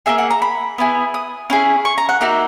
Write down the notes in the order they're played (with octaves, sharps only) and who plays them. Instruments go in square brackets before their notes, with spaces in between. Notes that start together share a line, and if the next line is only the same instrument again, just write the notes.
[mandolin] A#3 D#4 G#4 E5
F#5
A#5
B5
B3 E4 G#4
D#6
C#4 E4 G#4
C#6
A#5
F#5
A#3 D#4 F#4 E5